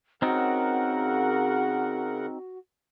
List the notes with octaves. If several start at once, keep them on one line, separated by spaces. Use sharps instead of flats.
C#3 C4 D#4 F#4 A#4 F#5